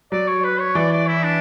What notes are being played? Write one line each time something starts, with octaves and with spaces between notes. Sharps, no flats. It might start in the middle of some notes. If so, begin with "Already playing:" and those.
F#3 D5
C#5
B4
C#5
E3 D5
D5
E4
D4